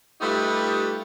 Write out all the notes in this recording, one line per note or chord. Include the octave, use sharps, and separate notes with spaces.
G3 A3 D#4 F4 G4 B4